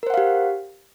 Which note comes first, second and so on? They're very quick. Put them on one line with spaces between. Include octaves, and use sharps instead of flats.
A#4 C5 F#5 F5 G4